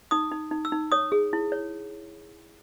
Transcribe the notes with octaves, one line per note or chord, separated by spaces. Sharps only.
D#4 D#6
D#4
D#4
E6
D#4
C#5 D#6
G#4
E4
C#5